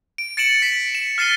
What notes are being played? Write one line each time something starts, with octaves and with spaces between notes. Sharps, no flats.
D7
A6 C#7 D7 E7 F#7
B6
E7
F6 A6 C7 D#7 G7